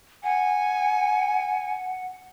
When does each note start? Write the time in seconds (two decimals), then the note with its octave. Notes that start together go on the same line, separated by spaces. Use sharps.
0.24 F#5 G#5